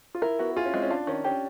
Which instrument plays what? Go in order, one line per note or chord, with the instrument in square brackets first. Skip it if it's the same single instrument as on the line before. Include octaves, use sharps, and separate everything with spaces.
[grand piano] F4
[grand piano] E4 [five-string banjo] A#4
[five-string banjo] B3 [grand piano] F#4
[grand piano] F4 [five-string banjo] G#4
[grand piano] C#4
[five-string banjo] G#3 [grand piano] C4
[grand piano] C#4
[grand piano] D4 [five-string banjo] F4
[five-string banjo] D#3 [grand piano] C#4
[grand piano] C#4 [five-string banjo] G4